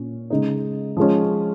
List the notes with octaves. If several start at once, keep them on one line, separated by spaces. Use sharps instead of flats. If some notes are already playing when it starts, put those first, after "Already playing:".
Already playing: A#2 C#4
C#3 G#3 D#4
F3 G#3 C#4